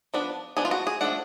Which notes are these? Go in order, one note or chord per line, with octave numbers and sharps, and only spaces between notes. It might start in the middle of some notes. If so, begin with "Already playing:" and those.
F3 B3 D4
F3 B3 D4 G#4
F4
F#4
G#4
F3 A3 D4 F#5